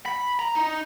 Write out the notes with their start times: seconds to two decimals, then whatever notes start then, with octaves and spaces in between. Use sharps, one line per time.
0.06 B5
0.39 A#5
0.55 D#4